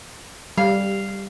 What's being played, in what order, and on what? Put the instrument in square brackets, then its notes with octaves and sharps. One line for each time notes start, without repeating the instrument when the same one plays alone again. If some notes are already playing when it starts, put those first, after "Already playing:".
[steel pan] G3 [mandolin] F5